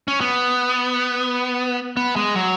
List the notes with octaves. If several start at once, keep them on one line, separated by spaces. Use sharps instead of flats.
C#4
B3
B3
G#3
F#3